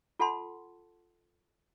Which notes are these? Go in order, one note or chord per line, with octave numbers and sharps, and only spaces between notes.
F4 A4 F#5 A5 C6